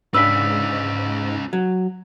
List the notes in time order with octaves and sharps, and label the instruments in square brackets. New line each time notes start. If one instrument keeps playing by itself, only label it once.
[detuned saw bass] G#2 [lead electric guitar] C#4 F4 [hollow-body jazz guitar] D4 B4 [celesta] E6 B6
[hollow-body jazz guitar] F#3